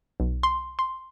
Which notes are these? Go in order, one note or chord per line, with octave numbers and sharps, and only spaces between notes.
B1
C6
C6